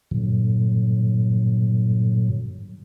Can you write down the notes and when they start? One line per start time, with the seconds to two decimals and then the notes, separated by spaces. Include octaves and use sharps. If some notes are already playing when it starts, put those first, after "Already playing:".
0.11 G2 A#2 D3 F#3